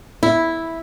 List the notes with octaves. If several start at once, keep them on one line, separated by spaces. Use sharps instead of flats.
E4